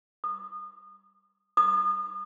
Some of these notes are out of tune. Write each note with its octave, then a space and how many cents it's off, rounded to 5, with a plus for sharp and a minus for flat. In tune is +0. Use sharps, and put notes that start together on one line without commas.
D#6 -30
D#6 -35